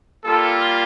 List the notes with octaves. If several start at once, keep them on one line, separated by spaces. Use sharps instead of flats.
G3 A#3 F4 A4